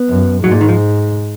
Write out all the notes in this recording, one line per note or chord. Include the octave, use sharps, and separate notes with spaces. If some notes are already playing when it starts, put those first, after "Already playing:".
Already playing: B3
F#2
G#2 F#3
A#2
D#3
F3